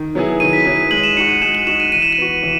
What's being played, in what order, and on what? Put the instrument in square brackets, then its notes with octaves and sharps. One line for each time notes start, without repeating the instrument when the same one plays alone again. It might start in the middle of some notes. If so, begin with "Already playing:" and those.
Already playing: [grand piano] D#3
F#3 B3 E4 G#4
[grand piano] D#3 [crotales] D#7
[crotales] B6
[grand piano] F#3 B3 E4 G#4 [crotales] B6
[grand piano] G#3 [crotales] F#7
[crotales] E7
[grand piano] D#4 [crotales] C#7
[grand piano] F#4
[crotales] D#7
[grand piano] G#3 [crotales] E7
[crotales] F#7
[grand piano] D#4 F#4 [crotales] E7
[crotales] D#7
[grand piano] E3 [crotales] D#7
[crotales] E7
D#7
[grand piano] B3 F#4
E3